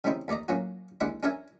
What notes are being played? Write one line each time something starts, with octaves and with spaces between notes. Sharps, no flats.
C#3 G3 A3 C4 D#4 E4
D#2 A3 D5 D#5 A#5
A2 F#3 A#3 C#4 F#4
D#2 G#3 D4 E4 F#5 B5
C#4 D4 A4 A#4 E5 G#5